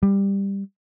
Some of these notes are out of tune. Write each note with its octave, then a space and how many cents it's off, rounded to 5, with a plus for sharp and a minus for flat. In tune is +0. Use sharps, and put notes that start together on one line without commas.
G3 +10